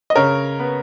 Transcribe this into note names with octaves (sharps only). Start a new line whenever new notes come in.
D#5
C#3 A#4 C#5
B3